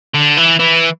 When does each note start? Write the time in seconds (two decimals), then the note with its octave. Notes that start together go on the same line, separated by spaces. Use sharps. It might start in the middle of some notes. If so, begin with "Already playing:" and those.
0.15 D3
0.38 E3
0.60 E3